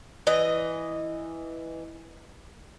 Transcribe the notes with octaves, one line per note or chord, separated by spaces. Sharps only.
E3 D#5